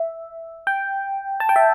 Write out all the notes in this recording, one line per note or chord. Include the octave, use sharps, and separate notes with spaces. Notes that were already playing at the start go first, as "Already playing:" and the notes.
Already playing: E5
G5
A5
G5
E5